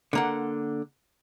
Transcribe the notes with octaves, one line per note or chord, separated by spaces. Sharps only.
D3 A#3 F#5